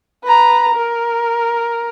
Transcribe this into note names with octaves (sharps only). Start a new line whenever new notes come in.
B4 A#5
A#4